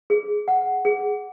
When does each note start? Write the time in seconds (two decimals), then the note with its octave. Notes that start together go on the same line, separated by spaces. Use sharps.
0.10 G#4
0.48 F#5
0.85 G#4